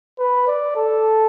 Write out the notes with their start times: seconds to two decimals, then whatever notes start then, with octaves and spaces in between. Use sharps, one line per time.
0.19 B4
0.47 D5
0.76 A4